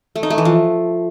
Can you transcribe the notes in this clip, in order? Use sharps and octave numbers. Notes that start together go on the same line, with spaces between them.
A3
D#4
A3
E3
F3